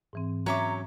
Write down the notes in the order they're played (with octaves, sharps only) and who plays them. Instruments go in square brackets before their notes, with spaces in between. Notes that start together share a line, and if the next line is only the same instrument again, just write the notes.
[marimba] G#2 E3 C4
[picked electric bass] F#3 C#4 [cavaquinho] C#5 E5 D6 [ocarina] A#5